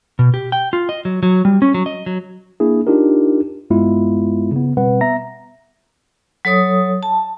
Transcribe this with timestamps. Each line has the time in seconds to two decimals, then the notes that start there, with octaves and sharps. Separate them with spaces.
0.19 B2
0.34 G4
0.52 G5
0.73 F4
0.89 D#5
1.05 F#3
1.23 F#3
1.45 G3
1.62 C#4
1.74 F#3
1.86 D#5
2.06 F#3
2.60 A#3 D4 E4 G#4
2.87 D4 D#4 F4 G4 A#4
3.70 G2 G#3 B3 E4 F4
4.52 C#3 B3
4.77 B2 G3 C4 B4 F#5
5.01 B3 E5 A#5 A#6
6.45 F#3 A4 C#5 D#6
7.03 A5